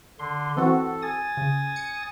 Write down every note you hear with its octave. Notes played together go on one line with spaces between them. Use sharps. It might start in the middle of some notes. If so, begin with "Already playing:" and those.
D3 C6
E3 C4 F#4 A4
G#5 D#6 A6
C#3
C#7 D#7